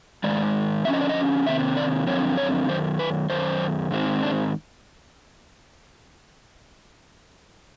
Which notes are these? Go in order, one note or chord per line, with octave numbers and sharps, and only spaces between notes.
G#2 D#3 G#3 D5
D3 F3 A#3 C#4 E5
D#5
D5
D#5
C3 D#3 C4 E5
D5
F#2 D3 F3 C4 C#5
C#5
F#2 D#3 C5
B4
F#2 D#3 C5
G#2 D#3 G#3 C4
D4